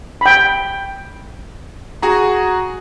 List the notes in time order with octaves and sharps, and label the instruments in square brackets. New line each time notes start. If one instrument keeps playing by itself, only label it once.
[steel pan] G5 B5
[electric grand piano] F#4 G#4 A#5